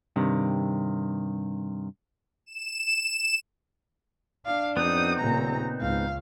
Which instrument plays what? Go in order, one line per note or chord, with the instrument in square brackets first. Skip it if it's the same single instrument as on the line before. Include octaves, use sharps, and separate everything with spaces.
[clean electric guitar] G2 C3 D#3
[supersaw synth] E7
[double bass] D4 [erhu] F5
[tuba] F2 [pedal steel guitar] B3 C4 D#4 [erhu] D#6
[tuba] D#1 [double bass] A#2 C#3 [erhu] A#5
[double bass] C#2 [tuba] G#2 [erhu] F5